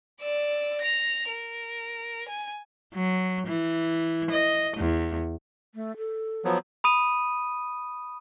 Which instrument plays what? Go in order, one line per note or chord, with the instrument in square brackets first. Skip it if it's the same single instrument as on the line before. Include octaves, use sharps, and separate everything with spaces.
[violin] D5 E6
A#6 F7
A#4
G#5
[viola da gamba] F#3
E3
D#5
E2
[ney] A3
A4
[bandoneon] F3 F#3 B3
[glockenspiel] B5 D#6 D#7